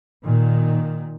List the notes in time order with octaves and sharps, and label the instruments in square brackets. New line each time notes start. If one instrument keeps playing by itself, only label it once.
[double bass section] A#2 D#3